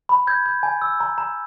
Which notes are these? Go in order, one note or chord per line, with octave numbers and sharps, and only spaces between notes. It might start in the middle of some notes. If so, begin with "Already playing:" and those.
B5
G6 G#6
G6
G#5
E6
A#5
A#5